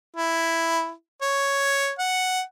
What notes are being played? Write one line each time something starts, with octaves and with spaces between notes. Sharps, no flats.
E4
C#5
F#5